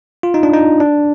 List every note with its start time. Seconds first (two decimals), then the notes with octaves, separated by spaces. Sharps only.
0.23 F4
0.34 D#4
0.43 D4
0.54 D#4
0.80 D4